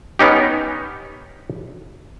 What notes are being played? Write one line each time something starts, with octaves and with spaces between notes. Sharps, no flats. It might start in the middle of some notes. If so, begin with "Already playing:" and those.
B3 C#4 D#4 G4